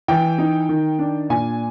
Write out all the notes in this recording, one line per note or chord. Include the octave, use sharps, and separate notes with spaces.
E3 G5
D#4
D#3
D4
A#2 G#5